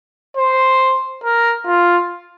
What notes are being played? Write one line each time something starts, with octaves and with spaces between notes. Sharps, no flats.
C5
A#4
F4